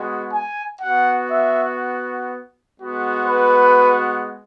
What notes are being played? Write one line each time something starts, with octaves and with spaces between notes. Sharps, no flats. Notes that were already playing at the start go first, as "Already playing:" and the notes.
Already playing: G#3 B3 F#4
G#5
B3 F#4 F#5
E5
G#3 B3 F#4
B4